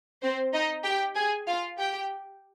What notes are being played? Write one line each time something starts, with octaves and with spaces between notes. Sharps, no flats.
C4 C5
D#4 D#5
G4 G5
G#4 G#5
F4 F5
G4 G5